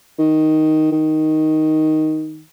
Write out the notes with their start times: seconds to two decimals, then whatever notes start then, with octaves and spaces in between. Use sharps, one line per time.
0.19 D#3
0.92 D#3